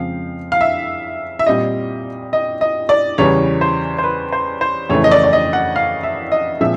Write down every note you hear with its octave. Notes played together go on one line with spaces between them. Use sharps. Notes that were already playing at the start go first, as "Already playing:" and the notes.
Already playing: F2 C#3 F3 G#3 C4 F5
F5
E5
E5
A#2 G3 C4 D#5
D#5
D#5
D5
E2 C#3 E3 G3 C#5
C5
C5
B4
C5
C5
F2 C#3 E3 A3 C#5
D#5
D5
D5
D#5
F#5
F5
E5
D#5
A#2 F3 G#3 C4 E5